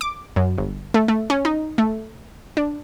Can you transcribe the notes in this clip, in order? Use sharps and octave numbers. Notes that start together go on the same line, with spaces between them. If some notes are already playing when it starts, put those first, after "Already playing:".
D6
F#2
G1
A3
A3
C#4
D#4
A3
D4